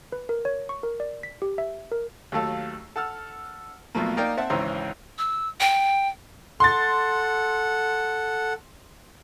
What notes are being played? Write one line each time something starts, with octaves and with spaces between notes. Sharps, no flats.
B4
A#4
C#5
C#6
A#4
D5
B6
G4
E5
A#4
D#2 F#3 A3 A4 F5
A4 F#5 A5 E6 F6
B1 B2 F3 A3 A#3
A#3 D#4 A#4 D5 G5
C4 E5 F#5 A5
G#1 C#2 E3 C#4 C5 A#5
E6
G5
A4 F#5 C6 A6